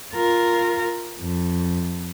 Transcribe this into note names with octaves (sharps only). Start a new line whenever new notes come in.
F4 A#4
F2